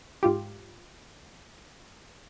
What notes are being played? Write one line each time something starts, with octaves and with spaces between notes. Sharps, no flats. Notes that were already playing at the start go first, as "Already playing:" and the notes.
G#2 F4 G4